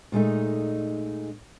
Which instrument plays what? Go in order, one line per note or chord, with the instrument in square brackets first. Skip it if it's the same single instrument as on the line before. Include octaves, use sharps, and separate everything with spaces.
[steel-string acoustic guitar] A#2 G#3 A3 D#4